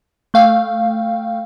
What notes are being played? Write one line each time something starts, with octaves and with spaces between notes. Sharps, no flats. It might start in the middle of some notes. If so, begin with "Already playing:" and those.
A3 F5 G5